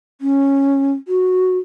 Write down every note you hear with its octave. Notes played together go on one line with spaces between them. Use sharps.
C#4
F#4